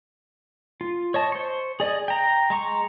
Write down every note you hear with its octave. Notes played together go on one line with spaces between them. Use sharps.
F4
C#5 D#5 A5
C5 C#6
G#4 D5 D#5 G#5
G5 A#5
G#3 A#5 C#6